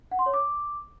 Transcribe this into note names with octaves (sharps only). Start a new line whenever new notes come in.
F#5
C6
C#5
D6